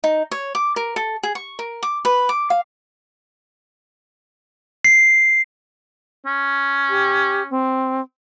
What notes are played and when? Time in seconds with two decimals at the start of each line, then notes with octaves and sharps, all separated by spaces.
0.04 D#4
0.31 C#5
0.55 D6
0.76 A#4
0.96 A4
1.23 G#4
1.35 C#6
1.59 A#4
1.83 D6
2.05 B4
2.29 D6
2.50 F5
4.85 C7
6.26 C#4
6.89 G4
7.50 C4